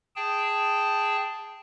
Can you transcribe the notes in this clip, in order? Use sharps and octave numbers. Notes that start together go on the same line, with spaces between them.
G#4 G5 A5